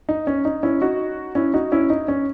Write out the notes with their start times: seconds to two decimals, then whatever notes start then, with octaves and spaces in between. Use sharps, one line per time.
0.09 D#4
0.27 C#4
0.45 D#4
0.63 C#4 E4
0.82 D#4 F#4
1.35 C#4 E4
1.54 D#4 F#4
1.72 C#4 E4
1.90 D#4
2.08 C#4